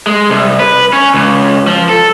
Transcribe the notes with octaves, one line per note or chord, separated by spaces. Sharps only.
G#3
C2
B4
C#4
C#2
F3
A4